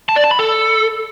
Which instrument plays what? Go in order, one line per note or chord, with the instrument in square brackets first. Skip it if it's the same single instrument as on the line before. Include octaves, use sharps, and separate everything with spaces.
[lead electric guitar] A5
D5
A5
B5
A4